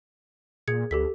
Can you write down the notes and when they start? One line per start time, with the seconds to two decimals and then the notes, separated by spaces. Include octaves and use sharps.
0.68 A#2 G#4 G#6 C#7
0.91 D2 G4 A4 B6